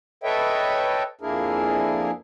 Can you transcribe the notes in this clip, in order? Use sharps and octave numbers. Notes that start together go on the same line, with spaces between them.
A4 B4 C#5 D#5 E5 G5
F2 A#3 D4 E4 G#4 A#4